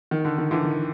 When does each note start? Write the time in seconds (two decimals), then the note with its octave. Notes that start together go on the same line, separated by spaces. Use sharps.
0.11 D#3
0.25 D3
0.38 D#3
0.51 D3 E3
0.64 D#3